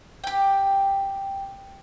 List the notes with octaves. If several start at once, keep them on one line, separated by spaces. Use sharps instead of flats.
G4 G5